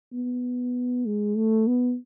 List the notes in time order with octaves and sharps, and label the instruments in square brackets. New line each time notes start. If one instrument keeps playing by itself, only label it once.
[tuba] B3
G#3
A3
B3